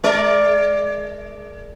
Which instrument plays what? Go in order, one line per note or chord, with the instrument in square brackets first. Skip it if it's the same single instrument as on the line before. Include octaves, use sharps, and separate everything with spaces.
[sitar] G#3 A#4 D5